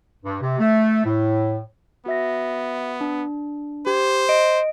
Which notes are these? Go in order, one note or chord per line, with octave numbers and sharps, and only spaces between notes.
G2
C3
A3
A2
B3 F#4 E5 A#6
D4
G4 C5 G#6
D#5 D7